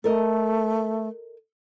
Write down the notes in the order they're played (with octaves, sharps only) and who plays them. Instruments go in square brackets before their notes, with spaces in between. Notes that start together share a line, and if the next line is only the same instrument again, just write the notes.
[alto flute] A3 [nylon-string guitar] A4 A#4 D#5